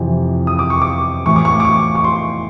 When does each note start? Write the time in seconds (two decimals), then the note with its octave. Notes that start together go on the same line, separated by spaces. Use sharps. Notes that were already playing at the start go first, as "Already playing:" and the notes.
Already playing: F2 C3 E3
0.47 D#6
0.59 D6
0.70 C#6
0.82 D6
1.26 A2 E3 C#6
1.36 D6
1.45 C#6
1.60 D6
1.65 C#6
1.95 C#6
2.04 C6